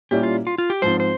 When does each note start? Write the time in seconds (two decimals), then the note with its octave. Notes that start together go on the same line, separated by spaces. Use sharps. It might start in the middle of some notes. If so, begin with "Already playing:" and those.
0.11 A#2 G3 C#4 E4 G4
0.23 F4
0.47 F4
0.58 F4
0.70 G4
0.82 G#2 F3 C4 C5
1.00 C5